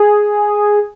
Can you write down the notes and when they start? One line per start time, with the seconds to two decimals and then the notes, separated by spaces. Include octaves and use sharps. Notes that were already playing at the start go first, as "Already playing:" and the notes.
Already playing: G#4